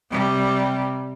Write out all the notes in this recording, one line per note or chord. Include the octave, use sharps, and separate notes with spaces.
C3 G3